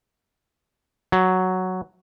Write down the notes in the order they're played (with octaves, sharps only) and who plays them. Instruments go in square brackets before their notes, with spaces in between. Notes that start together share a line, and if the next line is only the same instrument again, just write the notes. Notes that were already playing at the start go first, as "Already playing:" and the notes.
[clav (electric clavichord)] F#3